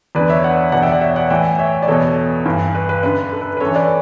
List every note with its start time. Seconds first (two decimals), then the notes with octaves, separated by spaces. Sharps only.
0.15 E2 D3 B4 D5
0.30 C#5 E5
0.44 D5 F#5
0.72 E2 B2 D5 F#5
0.82 E5 G5
0.92 D5 F#5
1.01 C#5 E5
1.16 D5 F#5
1.30 A2 E3 E5 G5
1.59 C#5 E5
1.82 D5
1.87 E2 B2 A4 C#5
2.46 G2 E3
2.75 B4
2.89 B4
3.03 F#2 D3 B4
3.33 A4
3.41 B4
3.57 B4
3.60 F#2 E3 A4 C#5
3.75 B4 D5